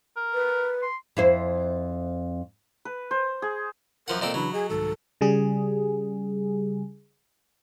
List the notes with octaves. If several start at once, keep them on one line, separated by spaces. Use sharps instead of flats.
A#4
B4
C6
F2 E4 C5
B4
C5
G#4
F#2 F3 A#4 F#5
A#2 C4 A4 D#5
C#3 E3 F#3 D4 B5
G#4 D#5
C2 G#2 D#3 A4
C#3 G3 G#4